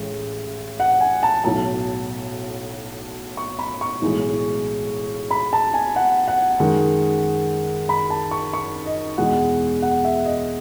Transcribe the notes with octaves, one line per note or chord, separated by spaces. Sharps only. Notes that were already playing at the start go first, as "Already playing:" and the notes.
Already playing: A1 A2 G#3
F#5
G#5
A5
B1 A2 F#3 A5
C#6
B5
C#6
B1 A2 E3 G#3
B5
A5
G#5
F#5
F#5
F#2 D#3 G#3
B5
A5
C#6
C#6
D#5
E2 B2 G#3 F#5
F#5
E5
D#5